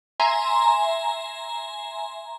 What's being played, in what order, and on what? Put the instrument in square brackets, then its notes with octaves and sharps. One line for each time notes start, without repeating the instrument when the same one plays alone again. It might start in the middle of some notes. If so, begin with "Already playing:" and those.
[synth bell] E5 G#5 A#5 C6